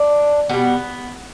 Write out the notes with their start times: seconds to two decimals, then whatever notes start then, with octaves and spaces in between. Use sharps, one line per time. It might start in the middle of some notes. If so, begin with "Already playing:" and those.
Already playing: D4
0.49 B2 G3 B3